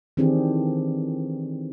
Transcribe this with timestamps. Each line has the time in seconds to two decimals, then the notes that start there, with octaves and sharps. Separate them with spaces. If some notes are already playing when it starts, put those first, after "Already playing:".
0.17 D#3 E3 C4 D4 G4 G#4